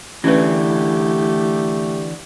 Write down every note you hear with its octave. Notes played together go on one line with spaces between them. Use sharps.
D3 E3 A3 C#4 G4 B4